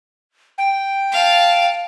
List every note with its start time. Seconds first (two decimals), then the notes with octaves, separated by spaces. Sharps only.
0.58 G5
1.12 F5 A5